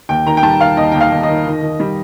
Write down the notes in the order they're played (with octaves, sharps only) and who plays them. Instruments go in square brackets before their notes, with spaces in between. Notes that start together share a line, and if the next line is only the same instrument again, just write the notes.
[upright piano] D#2 G5
D#3 A#5
G5
G3 A5
D#3 F5
D#2 D#5
D#2 G5
F5
D#2
D#5
D#3
D#3
D#3
G3